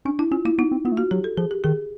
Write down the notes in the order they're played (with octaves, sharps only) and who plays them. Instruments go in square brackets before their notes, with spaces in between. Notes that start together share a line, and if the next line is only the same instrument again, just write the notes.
[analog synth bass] C#4 [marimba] D4
[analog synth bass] D4 [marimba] E4
[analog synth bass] C#4 [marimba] F4
[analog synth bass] A#3 [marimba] E4
[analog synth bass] B3 [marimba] D#4
[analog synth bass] C4
[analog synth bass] B3 [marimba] F4
[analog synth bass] A3
[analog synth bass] A#3 [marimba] F#4
[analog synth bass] F#3 [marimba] G4
[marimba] A4
[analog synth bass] F3 [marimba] G#4
[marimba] G4
[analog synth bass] D#3 [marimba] G#4